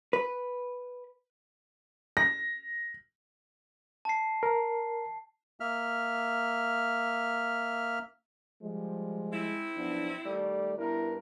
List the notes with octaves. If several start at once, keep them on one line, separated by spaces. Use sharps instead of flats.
B4
A#6
A5 C7
A#4
A#3 E5 F6
F3 G3 G#3
C4 E4
B1 F3 B3 D4
D#3 G3 A3 D5
G2 B3 E4 A#4